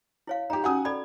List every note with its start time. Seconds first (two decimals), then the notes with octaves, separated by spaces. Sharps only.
0.27 E4 C#5 F5
0.50 D#4 G4 A#5
0.64 C#4 D#4 F#4 F#5 G#5 D#6
0.85 A4 D5 B5 G#6